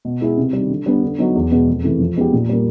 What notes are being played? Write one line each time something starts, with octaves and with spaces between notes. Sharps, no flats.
B2
G#3 B3 E4 G#4
C3
D#3 G3
D3
G3 B3 D4
D3
F#3 B3 D#4 F#4
E2
B2 G#3 B3
F2
C3 E3 A3
F3
G#3 B3 D#4 G4
A#2
G3 A#3